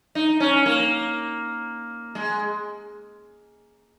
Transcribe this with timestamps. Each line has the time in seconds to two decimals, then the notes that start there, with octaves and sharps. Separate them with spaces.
0.15 D#4
0.40 C#4
0.66 A#3
2.15 G#3